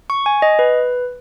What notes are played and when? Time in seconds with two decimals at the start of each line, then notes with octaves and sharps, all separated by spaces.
0.10 C#6
0.26 G#5
0.42 D#5
0.59 B4